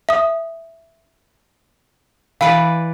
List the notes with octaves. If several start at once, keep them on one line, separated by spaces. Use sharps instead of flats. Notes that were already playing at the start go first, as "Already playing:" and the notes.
E5 D#6
E3 B4 D5 F5